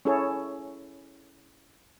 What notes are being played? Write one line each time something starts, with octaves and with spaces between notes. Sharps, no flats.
C#4 E4 G#4 A4 C#5